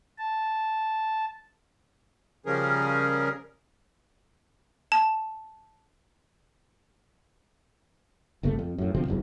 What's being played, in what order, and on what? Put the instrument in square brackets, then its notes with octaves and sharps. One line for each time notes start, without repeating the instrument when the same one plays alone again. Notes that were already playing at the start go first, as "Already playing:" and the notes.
[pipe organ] A5
[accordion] C#3 F3 G3 C#4 G#4 A#4
[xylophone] A5
[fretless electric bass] G1 C#2 C3 A3
F2
F#2 A2
B2 D3 F3 C4
F#1 B1 E2 G#2